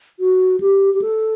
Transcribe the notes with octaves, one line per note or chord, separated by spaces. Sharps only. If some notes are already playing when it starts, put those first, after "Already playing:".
F#4
G4
G4
A4